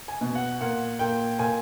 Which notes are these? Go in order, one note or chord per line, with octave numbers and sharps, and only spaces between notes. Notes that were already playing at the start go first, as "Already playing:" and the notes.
G#5
B2
F#5
A#2 F#5
A#2 G5
A#2 G#5